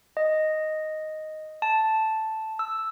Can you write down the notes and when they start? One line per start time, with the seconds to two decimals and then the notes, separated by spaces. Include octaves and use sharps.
0.17 D#5
1.62 A5
2.59 E6